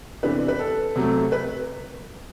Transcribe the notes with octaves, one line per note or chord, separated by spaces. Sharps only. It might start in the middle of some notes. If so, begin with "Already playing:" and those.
C3 E3 B3 D4 B4
B4
A4
C3 F#3 A3
B4